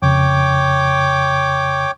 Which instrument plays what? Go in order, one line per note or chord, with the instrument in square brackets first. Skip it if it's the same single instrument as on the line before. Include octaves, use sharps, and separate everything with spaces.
[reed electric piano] F2 C#3 [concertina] C#5 G5 D6